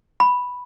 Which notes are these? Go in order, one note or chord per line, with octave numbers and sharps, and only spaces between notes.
B5